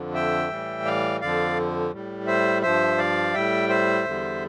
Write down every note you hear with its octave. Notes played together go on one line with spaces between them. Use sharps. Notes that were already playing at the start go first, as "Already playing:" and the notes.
Already playing: F2 D3 F3
E5 G5
A2 E3 G3
D5 F5
F2 D3 F3 D5 F5
A2 G3
C5 E5
G2 F3 C5 E5
D5 F5
A2 G3 E5 G5
C5 E5
E2 D3 G3